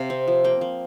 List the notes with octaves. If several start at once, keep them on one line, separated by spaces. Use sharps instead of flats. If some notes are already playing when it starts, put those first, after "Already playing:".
Already playing: C3 F5
C4
F3
A#3 G5
A#3